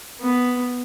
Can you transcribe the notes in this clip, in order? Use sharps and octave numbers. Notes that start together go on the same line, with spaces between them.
B3